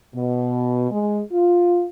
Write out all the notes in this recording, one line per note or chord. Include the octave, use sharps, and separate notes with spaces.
B2
G#3
F4